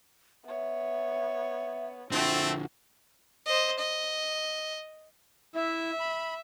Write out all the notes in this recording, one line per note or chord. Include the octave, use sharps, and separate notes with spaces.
B3 C#5 E5
D3 F3 A3 C4 F#4
C5 D#5
D#5
E4 E5
B5